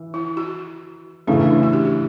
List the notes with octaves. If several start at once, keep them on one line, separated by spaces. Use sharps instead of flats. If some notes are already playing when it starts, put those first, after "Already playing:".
Already playing: E3
E4
F#4
C#3 E3 A3 D4
D4
F#4
G4
E4